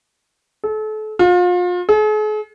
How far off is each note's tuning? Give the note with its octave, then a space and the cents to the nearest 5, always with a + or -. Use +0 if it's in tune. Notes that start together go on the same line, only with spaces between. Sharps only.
A4 -35
F4 +35
G#4 +45